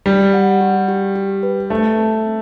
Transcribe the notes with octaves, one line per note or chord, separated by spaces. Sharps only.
G3 G4
F#5
G4
G4
G4
B4
A3 C5
C4
C4